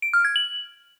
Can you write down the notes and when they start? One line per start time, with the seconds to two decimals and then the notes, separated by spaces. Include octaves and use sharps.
0.02 D7
0.13 F6
0.25 G#6
0.36 F#7